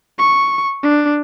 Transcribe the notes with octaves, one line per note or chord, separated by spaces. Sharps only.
C#6
D4